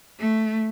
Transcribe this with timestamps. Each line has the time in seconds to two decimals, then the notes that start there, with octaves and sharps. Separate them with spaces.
0.19 A3